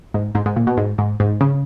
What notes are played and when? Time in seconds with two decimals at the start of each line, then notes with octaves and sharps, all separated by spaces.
0.14 G#2
0.35 G#2
0.46 G#2
0.56 A#2
0.67 B2
0.77 G#2
0.98 G#2
1.20 G#2
1.41 C#3